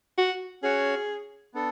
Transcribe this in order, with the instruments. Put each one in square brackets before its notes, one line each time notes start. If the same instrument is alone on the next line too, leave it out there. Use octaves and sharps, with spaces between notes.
[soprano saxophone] F#4
[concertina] C#4 F#4 C#5 F#5 [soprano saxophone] G#4
[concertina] B3 D4 A4